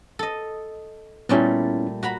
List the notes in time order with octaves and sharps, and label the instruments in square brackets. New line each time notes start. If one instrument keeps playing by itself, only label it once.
[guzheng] A4 D#5
[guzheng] A#2 G3 A3 [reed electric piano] B3 C#4 E4
[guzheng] F#4 A#5 B5